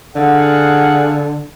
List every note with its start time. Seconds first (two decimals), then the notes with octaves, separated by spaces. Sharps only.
0.16 D3 G#4 F5 F#5